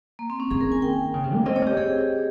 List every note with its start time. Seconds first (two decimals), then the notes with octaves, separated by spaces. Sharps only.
0.19 A#3
0.30 C4
0.40 C#4
0.50 D#3 G#4
0.61 A#4
0.72 G#5
0.82 G5
1.14 C#3
1.24 C3
1.34 A#3
1.46 C4 D#5
1.56 C#5
1.62 C#4
1.67 G4
1.77 C4 G#4